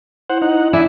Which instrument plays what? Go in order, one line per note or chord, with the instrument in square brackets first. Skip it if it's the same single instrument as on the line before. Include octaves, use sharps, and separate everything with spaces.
[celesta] E4 [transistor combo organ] C5 F#5
[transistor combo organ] D#4 F#5
[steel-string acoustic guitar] D4 E4 [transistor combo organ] D5 E5 G#5